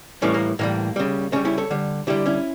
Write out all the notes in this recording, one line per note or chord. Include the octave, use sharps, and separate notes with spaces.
A2 E3 G3 A3 C#4
A#3
A2 E3 G3 A#3
C#3 G3
C#3 G3 A3 C#4
C#4 E4
A4 C#5
D3 G3
D3 G3 E4 G4
C#4 E4